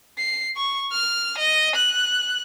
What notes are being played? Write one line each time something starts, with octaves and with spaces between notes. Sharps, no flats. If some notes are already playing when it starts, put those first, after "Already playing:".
C7
C#6
F6
D#5
F#6